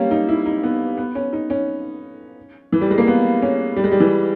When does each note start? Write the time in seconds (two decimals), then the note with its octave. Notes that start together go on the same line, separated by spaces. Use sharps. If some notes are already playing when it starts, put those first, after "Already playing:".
Already playing: G3 A#3 C#4
0.11 D#4
0.29 E4
0.46 D#4
0.63 B3
0.98 B3
1.15 C#4
1.33 D#4
1.50 C#4
2.73 E3
2.81 G3
2.91 G#3
2.98 A#3
3.07 B3
3.42 C#4
3.76 G3
3.84 G#3
3.92 G3
4.00 E3